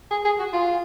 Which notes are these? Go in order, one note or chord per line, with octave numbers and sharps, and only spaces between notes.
G#4
G#4
F#4
F4